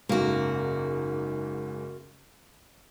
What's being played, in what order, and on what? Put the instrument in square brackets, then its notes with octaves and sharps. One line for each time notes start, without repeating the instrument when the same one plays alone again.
[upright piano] F#1 G#2 [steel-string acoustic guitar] A#3 F#4